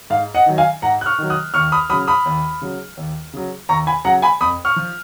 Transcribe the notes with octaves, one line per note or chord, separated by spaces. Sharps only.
G#2 F5
D#5 F#5
D#3 F#3
F5 G#5
G#2 F#5 A#5
F#6
C#6 F6
D#3 F#3
D#6 F#6
D#2 C#6 F6
B5 D#6
C#3 F#3 B5 D#6
B5 D#6
D#2
C#3 F#3
D#2
C#3 F#3
D#2 A#5 C#6
G#5 B5
C#3 F#3 F#5 A#5
G#5 B5
F2 B5 D#6
C#6 F6
F3